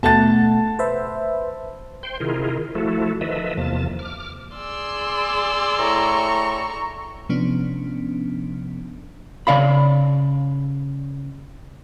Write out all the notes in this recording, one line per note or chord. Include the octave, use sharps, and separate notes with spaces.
B2 A3 F#5 A5 A6
B4 C5 E5
C5 G5 C6
C3 D#3 E4 F4 G#4 A#4
F3 A3 E4 F#4 A4
D#3 F3 A4 B4 D#5 E5
E2 C3 F3 A#3 A5
D6 F6
G#4 D5 C6 E6
A2 A#5 C#6
C3 F3 B3 C#4 D4
C#3 D5 F5 B5